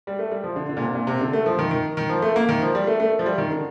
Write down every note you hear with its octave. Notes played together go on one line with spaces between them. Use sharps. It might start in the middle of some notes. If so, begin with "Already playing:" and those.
G3
A3
G3
F3
D3
D3
A#2
C3
A#2
C3
D3
A3
F3
D#3
D#3
D#3
F3
A3
A#3
D#3
F3
G3
A3
A3
F3
G3
D#3
D3